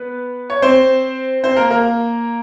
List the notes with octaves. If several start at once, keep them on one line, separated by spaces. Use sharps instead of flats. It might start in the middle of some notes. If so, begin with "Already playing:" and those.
Already playing: B3 B4
C#5
C4 C5
C4 C5
A#3 A#4
A#3 A#4